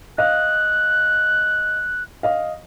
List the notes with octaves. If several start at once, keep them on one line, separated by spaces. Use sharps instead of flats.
D#5 F5 F#6
D#5 F5